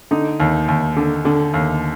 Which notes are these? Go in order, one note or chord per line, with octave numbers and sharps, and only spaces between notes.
D3 D#4
D#2
D#2
D3
D3
D#2